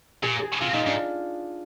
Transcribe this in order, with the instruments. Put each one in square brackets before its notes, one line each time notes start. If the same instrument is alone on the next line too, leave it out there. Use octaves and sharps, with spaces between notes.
[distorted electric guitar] A#2 [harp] G#4
[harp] G#4
[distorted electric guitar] C3 [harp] F4
[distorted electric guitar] A#2 [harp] D#4
[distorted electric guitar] G#2 [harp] D4